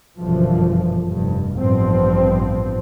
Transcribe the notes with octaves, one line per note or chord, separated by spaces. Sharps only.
G1 F#2 B2 D3 E3 F3
F1 G2
A1 G2 F3 B3 C4